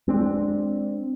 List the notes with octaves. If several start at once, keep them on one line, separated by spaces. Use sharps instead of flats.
G#3 C4 D4